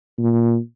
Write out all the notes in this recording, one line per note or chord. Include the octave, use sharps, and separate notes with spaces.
A#2